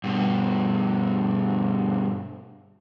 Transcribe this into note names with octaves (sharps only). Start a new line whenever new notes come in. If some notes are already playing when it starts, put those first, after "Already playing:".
G2 B2